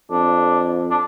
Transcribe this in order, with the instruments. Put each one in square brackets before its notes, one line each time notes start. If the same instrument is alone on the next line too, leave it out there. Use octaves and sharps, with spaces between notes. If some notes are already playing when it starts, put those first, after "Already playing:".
[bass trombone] F2 [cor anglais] D4
[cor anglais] D4